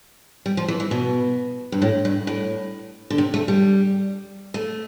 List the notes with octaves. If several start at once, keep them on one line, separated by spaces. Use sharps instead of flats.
G3
F3
E3
E3
B2
G2
A2
G2
A2
D3
C3
A3
G3
A3